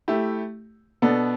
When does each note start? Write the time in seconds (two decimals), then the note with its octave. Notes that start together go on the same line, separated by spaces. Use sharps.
0.08 A3 E4 G4
1.02 B2 B3 D4 A4